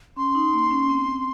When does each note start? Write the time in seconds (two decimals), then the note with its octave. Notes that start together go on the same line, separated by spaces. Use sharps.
0.16 C#4 C6
0.35 D#4
0.53 A#3
0.71 C#4
0.89 C4